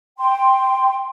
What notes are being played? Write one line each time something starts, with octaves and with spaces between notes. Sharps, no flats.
G5 C6